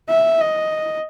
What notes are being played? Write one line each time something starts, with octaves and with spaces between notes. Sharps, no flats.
E5
D#5